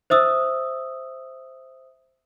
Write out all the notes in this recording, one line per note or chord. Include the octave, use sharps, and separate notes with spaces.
C5 E5 D#6 E6